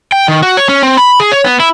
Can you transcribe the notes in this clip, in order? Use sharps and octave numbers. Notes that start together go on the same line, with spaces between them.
G5
D#3
F#4
C#5
C#4
C4
B5
G#4
C#5
B3
E4